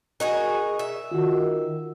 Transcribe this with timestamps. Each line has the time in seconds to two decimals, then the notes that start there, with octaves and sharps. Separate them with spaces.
0.20 D#4 F#4 G#4 A#4
0.79 E5
1.11 D#3 F4 F#4